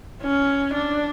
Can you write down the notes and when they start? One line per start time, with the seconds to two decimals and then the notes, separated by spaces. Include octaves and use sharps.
0.22 C#4
0.74 D4